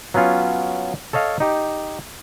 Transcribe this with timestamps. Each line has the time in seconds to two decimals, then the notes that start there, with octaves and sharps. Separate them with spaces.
0.14 F#3 B3 C#4 F4
1.13 A4 C#5 D#5 F5
1.40 D#4 G4